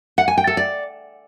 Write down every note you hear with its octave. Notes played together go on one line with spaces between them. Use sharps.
F#5
G#5
G5
A4
D5